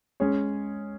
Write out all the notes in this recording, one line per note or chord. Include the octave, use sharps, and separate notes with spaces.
G#3 C#4 G#4 C#5